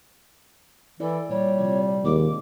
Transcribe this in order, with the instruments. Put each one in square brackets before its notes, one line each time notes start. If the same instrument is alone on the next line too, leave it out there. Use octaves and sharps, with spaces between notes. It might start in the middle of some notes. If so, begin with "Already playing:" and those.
[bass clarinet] E3 [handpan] E4 D5 [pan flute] A4
[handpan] A#2 [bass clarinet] G3 [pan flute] C#5
[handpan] C3 F3
[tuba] D#2 [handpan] G#3 [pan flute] D6